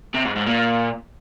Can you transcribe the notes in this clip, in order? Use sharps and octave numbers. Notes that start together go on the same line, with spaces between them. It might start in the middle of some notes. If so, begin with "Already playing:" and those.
C3
G#2
G#2
A#2